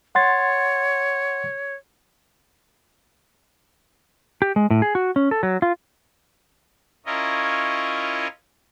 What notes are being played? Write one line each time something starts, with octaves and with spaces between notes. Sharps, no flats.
C#5 F#5 C6 A6
G4
G#3
A2
G#4
F#4
C#4
A4
F#3
F4
C#4 E4 F4 A#4 C#5 D#5